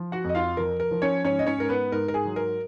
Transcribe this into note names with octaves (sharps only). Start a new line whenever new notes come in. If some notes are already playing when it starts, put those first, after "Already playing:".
Already playing: F3
F#4 F#5
F2
D#5
F4 F5
F3 A#4
A#4
F3
C#4 C#5
G#2 C#4 C#5
D#5
C#4 C#5
G#2 A#4
B3 B4
G#2 A#4
A#4
G#4
F#3
A#4